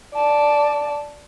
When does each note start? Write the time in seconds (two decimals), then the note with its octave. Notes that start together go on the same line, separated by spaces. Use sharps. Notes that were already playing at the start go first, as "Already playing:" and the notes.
0.15 D5 A5